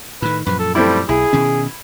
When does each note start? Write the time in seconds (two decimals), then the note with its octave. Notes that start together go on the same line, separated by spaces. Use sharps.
0.22 A2 D#3 B4
0.46 F#2 A#2 F3 B4
0.59 A4
0.75 G3 A3 C4 E4
1.09 B1 E4 G#4
1.33 B2 D#3 C#4